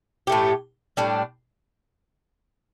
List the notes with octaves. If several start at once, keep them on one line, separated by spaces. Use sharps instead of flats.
A2 A3 G4
A2 G3 D4